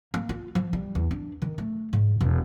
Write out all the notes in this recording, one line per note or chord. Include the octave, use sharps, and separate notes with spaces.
A#3
F4
F3
G3
E2
D4
D#3
A3
G#2
E1